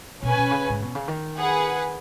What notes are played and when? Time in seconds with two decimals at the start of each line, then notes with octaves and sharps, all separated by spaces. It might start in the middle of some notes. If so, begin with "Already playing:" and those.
0.22 B2 C#4 B4 G#5
0.37 B2
0.51 C#3
0.69 G#2
0.82 B2
0.95 C#3
1.08 D#3
1.37 G#4 B4 F#5